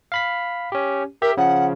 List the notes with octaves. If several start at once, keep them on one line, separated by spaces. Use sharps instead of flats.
F5 B5 B6
C#4 G4
G4 A#4 E5
C#3 F3 F#5